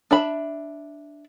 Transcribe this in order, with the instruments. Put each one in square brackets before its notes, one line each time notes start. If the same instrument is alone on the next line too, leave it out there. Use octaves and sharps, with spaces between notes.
[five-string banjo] D4 E5 B5